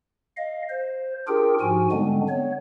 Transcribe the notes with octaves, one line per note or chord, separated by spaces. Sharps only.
D#5 F5
C5
D4 F4 G4 G#4 A#4 G5
G#2 F3 F#4 G#5
D3 G3 G#3 B3 C4 D4
B3 C#5